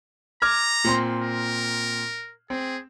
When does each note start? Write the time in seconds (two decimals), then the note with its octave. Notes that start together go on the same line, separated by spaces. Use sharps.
0.42 A#5 D6 F6 G#6
0.84 A#2 C4 C6
1.22 A#4
2.50 C4 G#4